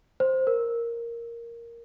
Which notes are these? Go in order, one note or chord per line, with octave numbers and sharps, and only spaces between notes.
C5
A#4